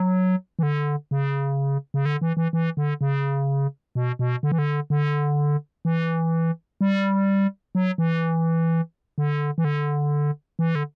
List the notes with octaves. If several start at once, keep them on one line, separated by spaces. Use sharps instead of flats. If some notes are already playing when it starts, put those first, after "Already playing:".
Already playing: F#3
E3
D3
C#3
C#3
D3
E3
E3
E3
D3
C#3
B2
B2
D3
E3
D3
D3
E3
G3
F#3
E3
D3
E3
D3
E3
D3